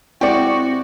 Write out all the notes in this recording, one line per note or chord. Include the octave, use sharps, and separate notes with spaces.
G#2 C4 E4 F#4 G4 D5 C#6 C#7